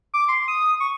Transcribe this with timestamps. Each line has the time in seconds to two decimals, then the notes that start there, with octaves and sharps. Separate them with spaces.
0.14 D6
0.28 C6
0.48 D#6
0.80 C#6